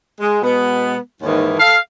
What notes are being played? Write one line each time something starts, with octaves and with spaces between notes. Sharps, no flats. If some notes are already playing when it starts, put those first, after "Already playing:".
G#3
B2 G#3 B3
D#2 G#2 D#3 E3
A4 F5